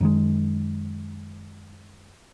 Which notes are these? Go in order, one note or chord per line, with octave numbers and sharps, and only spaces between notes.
F#2 D#3 G#3